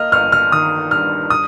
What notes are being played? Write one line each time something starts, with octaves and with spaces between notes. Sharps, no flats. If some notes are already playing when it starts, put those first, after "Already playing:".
Already playing: A#3 D#5 F6
G1 F6
F6
D#3 D#6
G2 F6
D#6